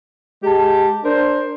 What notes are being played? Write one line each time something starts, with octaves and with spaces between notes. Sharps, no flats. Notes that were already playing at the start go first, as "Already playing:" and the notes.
G#3 G4 A5
D4 A#4 C5